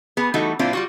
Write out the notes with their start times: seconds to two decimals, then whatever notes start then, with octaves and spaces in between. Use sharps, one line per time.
0.17 B3 G#4
0.34 E3 G3 A3 D#4 F#4 A4
0.59 A#2 F#3 C4 D4 E4 F4
0.73 G3 F4 F#4